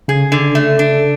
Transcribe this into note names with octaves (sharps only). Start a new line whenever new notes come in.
C#3 G#4
D3
A3
D4